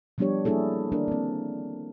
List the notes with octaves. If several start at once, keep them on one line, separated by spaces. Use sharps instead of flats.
F3 G3 B3 D4 G4 C#5
G3 A#3 D4 E4 G#4 A4
D#3 A#3 D4 A#4
A#3 C4